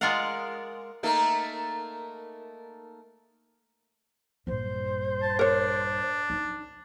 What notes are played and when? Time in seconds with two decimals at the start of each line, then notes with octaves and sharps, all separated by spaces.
0.01 G#3 F4 A#4 D5 F5 F#5
1.03 A3 A#3 D#4
4.47 A#1 G2 C5
5.22 A5
5.39 D4 A#4 C#5
6.30 C#4 D#4